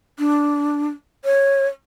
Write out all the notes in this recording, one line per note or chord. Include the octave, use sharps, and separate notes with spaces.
D4
C#5